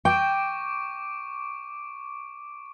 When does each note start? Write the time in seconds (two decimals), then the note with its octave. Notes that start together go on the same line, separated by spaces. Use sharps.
0.05 G5 C#6 D6 D7